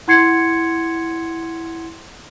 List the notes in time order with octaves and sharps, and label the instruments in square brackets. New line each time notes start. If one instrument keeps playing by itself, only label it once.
[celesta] E4 F#5 C6 G#6 C7 C#7